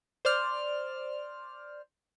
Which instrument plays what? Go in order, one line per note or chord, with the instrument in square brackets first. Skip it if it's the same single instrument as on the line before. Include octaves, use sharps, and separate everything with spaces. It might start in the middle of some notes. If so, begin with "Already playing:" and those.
[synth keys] C5 D5 F6